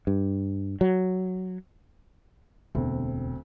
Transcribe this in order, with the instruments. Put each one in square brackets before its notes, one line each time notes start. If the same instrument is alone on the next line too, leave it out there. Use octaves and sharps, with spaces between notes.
[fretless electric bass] G2
F#3
[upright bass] E1 [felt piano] D2 C4